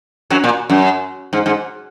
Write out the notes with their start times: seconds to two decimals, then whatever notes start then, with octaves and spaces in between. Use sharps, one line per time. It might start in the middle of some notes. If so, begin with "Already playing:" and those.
0.30 F#2 F#3
0.44 A#2
0.70 F#2
1.33 G#2
1.46 G#2